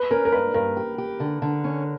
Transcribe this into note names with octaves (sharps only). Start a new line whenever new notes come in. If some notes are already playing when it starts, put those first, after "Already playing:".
Already playing: B4
C#4 A#4
A#4
G2 B4
G2 A#4
G4
G4
D3
D3
C#4